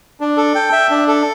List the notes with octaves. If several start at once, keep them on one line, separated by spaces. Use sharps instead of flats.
D4
A4
G5
E5
D4
A4